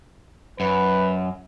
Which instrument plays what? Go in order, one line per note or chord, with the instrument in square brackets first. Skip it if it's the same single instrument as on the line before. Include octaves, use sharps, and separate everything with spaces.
[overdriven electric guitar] F#2 [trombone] B4